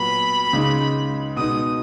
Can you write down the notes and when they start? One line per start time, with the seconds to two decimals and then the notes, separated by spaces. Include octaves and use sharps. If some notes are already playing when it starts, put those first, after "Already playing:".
Already playing: A#2 F#3 B3 B5
0.53 C#2 C#3 G#3 D#4
1.36 B2 G#3 D#4 D#6